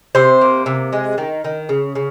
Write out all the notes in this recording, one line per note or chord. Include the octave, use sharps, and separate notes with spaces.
C3 C5
A#3
C3
G#3
D#3
D#3
C#3
C#3